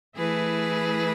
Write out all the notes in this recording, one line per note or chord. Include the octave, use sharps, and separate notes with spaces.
E3 A3 E4 G#4 B4